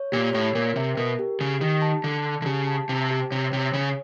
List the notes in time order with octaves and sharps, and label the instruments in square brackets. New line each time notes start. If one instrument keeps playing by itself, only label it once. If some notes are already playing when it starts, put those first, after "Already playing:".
Already playing: [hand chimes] C#5
[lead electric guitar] A#2 [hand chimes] G4
[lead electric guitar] A2 [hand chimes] C#5
[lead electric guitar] A#2 [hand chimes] A#4
[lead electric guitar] C3 [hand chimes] E5
[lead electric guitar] B2 [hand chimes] A#4
[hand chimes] G4
[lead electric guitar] C#3 [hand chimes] G4
[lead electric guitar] D#3 [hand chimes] G4
[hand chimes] A5
[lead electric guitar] D3 [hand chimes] A5
[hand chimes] A5
[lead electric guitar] D3
[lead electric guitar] C#3 [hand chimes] G4
[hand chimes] A5
[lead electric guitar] C3 [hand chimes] A5
[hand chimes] G4
[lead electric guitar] C3 [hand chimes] C#5
[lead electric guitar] C3 [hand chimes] C#5
[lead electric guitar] C#3 [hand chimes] C#5